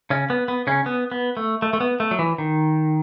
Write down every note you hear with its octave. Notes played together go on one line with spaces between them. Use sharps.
C#3 C#4
B3
B3
C#3 C#4
B3
B3
A3
A3
A3
B3
A3
F#3
E3
D#3